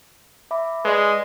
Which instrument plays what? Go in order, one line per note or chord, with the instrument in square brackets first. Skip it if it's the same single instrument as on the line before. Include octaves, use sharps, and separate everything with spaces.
[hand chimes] E5 B5 D6
[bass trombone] G#3 [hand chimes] B4 D5 D#5